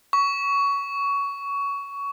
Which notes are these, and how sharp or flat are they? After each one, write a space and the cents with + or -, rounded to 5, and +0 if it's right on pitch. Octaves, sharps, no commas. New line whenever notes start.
C#6 +20